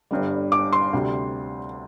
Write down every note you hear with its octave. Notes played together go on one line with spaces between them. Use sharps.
G1 G2 D3 G3
D6
C6
D2 C3 G3